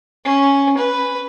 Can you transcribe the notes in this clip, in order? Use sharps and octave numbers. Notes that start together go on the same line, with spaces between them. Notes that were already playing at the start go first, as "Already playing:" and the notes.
C#4
B4